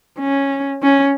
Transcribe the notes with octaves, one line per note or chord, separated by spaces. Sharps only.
C#4
C#4